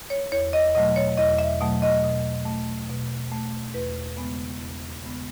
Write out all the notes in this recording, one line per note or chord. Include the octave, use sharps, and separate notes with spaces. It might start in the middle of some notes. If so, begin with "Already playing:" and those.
C#5
E2 C#5
D#5
B2 F#3 A3 D#5
C#5
E2 D#5
E5
B2 F#3 A3
D#5
B2
A3
B2
A3
E2 B4
C#3 G#3 B3
E2
C#3 G#3 B3